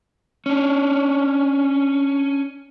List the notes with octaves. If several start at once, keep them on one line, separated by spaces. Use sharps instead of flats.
C#4 D4